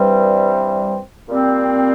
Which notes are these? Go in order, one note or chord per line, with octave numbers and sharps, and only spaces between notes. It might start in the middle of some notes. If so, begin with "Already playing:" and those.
Already playing: G2 E3 G3 C4
A#2 G3 C4